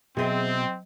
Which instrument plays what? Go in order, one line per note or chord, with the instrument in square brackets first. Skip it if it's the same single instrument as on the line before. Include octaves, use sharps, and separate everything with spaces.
[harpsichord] B1 D#5 [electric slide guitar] B2 [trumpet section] C4 [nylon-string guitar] G#4 E5